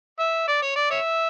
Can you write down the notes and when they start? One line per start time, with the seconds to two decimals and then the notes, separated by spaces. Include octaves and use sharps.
0.19 E5
0.48 D5
0.62 C#5
0.76 D5
0.91 C#5 E5